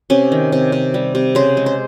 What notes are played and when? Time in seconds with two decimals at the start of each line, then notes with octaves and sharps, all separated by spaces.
0.10 C3 C#4
0.32 D#3
0.52 C3
0.72 C3
0.94 G3
1.15 C3
1.35 C#3 C5
1.57 G#3
1.66 C5